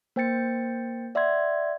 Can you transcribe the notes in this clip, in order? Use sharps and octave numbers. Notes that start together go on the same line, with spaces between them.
A#3 C5 G5 G6 A6 C#7
D5 E5 F#5 C6 G#6